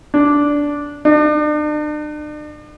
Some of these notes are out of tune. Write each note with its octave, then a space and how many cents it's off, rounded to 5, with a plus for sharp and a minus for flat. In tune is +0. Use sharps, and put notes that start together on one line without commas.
D4 -10
D4 +40